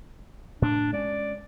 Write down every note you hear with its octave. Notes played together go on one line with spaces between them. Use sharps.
A2 D4
G#3 C#4 D5